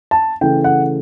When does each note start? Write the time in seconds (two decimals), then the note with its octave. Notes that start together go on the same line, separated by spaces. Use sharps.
0.11 A5
0.41 C#3 E3 A3 G5
0.64 F#5